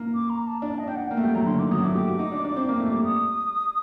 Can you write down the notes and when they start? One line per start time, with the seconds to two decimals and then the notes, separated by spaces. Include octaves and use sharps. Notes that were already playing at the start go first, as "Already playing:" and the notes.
Already playing: A#3
0.15 D6
0.30 A#5
0.47 A5
0.62 D4 A5
0.79 D#5
0.87 D4 G5
0.95 F#5
1.11 A#3 G5
1.17 A3
1.23 G3 G5
1.35 F#3 A#5
1.47 D3 C6
1.59 D#3 D6
1.71 F#3 D#6
1.84 A3 D6
1.95 G4 D6
2.08 F#4
2.19 D#4
2.32 D4
2.44 D4
2.56 C4
2.69 A#3
2.80 A3
2.92 G3
3.04 D#6